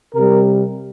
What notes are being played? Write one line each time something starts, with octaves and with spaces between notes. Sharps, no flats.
C3 G3 A#4